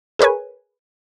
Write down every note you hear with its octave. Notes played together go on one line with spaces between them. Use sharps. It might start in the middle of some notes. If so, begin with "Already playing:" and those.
G#4 A#4 B4 C#5 G#5